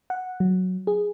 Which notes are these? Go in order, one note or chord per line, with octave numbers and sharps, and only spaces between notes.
F#5
F#3
G#4